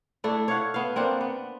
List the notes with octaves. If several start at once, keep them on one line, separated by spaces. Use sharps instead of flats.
A3 D4 E4
C#5 F5 F#5
B3 F5
A#3 C4 D4 F#5
B3